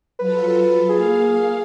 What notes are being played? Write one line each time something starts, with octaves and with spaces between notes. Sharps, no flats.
F#3 F4 A4 B4
A#3 G#4 F5